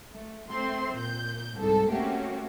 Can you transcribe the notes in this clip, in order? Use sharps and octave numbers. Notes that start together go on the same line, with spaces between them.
A3
A3 C4 C6
A#2 G6
C2 G#2 A4
A3 A#3 C4 C#4 F#4 G4